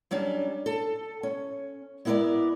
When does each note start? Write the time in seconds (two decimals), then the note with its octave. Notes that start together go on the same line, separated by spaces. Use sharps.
0.11 F#3 G3 C#4 D4
0.66 A4
1.23 C#4
2.05 G#3 B3 E4 G#4 A#4 D5